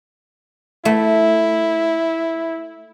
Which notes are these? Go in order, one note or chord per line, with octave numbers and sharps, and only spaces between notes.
A3 E4